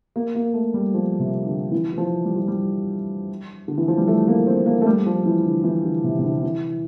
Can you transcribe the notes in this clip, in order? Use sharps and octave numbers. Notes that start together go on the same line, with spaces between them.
A#3
A#3
A3
G3
F3
C3
D3
E3
E3
F3
G3
F3
G3
D3
E3
F3
G3
A3
A#3
C4
A#3
A3
G3
F3
E3
D3
E3
D3
C3
C3
D3
E3